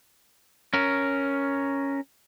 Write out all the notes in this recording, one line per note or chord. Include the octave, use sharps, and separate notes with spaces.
C#4 A#4